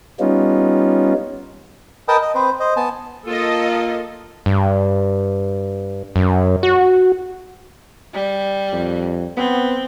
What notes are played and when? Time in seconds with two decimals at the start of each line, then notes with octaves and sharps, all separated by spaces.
0.20 G3 B3 C#4 D#4 F4
2.08 A#4 B4 D#5 G5 A5 D#6
2.22 D#5
2.35 C4 B4 C5
2.60 C5 D#5
2.76 B3 G#5 A5
3.26 A#3 F4 A4 D#5
4.46 G2
6.16 F#2
6.63 F#4
8.14 G3
8.73 F2
9.37 B3 C4